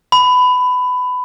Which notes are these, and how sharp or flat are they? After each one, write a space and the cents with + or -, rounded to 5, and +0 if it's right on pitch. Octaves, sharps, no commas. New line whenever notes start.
B5 +20